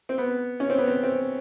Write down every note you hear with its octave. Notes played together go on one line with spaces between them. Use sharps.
C4
B3
C#4
C4
B3
C4
C4